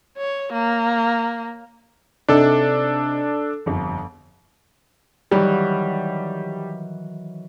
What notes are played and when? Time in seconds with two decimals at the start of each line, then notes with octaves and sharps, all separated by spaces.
0.17 C#5
0.52 A#3
2.29 C3 D4 D#4 A4
3.66 G1 F2
5.31 D#3 E3 F#3 G3